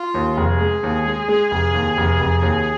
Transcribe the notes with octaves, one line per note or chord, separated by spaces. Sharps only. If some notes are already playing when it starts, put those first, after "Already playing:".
Already playing: F4
D#2
F1 G#4
G#3
D#2
G#3
G#3
F1
D#2
F1
F1
D#2